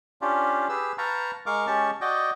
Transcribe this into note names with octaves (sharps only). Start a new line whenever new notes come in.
C#4 D4 F4 G4
G4 G#4 B4 E6
B4 F5 G5 A5 A#5 C#6
G#3 A#4 F5 C#6 D6
G#3 C#4 G4 A5 C#6
F#4 D5 D#5 G5